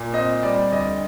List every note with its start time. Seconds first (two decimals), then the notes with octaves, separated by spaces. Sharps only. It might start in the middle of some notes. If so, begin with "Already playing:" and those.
Already playing: A#2
0.13 C4 D#5
0.43 G3 D5
0.72 D2 D#5